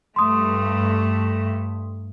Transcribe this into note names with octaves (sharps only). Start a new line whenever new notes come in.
G2 A3 C6 D#6